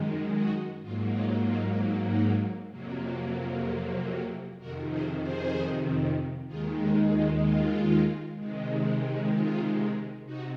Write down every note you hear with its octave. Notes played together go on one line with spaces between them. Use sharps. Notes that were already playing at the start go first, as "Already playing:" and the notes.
Already playing: F#2 D#3 G#3
D#4 F#4
G#2 F#3 A#3 F4
F4
F4
D#4 F#4
F2 C3 F#3 A#3
F2 C3 D#3 F#4 A#4
G#4 C5
G#4 C5
D#2 D#3 G#3 F4 G#4
D#4
F4
F4
C3 D#3 G#3
F4
C3 D#4 F#4